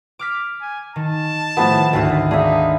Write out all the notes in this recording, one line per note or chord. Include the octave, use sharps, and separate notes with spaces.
D6 F6 B6
G#5
D#3 A5
A2 F3 A3 B3 F#4
G#1 D2 D4 F#4 E5
G#3 D4 D#4 G#4 E5 F5